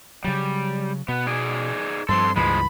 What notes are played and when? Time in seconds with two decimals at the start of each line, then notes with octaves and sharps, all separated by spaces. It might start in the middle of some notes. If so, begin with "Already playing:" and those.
0.24 C#3 F#3 G3
1.08 B2 B3
1.27 D#4 G#4 D5
2.09 G2 F3 C4 A4 C6
2.36 C#2 G2 E3 F3 G#3 B5